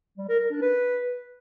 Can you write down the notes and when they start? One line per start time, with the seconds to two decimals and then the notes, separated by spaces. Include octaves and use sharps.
0.18 G3
0.29 A#4
0.40 A#4
0.51 D4
0.61 B4